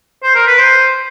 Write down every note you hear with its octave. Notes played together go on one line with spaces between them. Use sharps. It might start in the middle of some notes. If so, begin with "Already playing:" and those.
C5
A#4
B4
C5